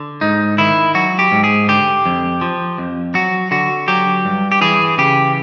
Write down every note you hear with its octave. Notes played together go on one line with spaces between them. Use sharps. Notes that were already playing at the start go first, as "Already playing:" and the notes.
Already playing: D3
G#2 D#4
D#3 E4
F#3 F#4
G4
G#2
G#4
D3 G4
F2
F3
F2
F#3 F#4
D3 F#4
F#3 G4
G2
G4
E3 G#4
C#3 G4